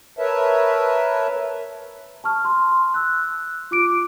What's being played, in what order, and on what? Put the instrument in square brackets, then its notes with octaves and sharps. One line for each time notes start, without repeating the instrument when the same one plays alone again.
[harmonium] A#4 B4 C#5 E5 A5
[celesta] A5 C#6 F6
C6
E6 F#6
F4 D6 D7